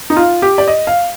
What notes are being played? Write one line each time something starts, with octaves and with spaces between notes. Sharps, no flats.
D#4
F4
G4
D5
D#5
F5